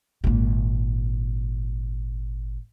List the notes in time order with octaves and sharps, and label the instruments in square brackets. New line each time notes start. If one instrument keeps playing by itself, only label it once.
[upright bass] G#1 A#2